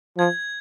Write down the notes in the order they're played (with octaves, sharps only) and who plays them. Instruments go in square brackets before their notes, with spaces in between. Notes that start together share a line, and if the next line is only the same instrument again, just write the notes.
[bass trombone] F3 [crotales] G#6